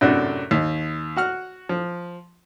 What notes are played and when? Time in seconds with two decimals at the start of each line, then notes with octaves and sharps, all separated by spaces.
0.01 F#2 A2 C3 D4 F#4
0.51 D#2
1.17 F#4 F#5 F6
1.69 F3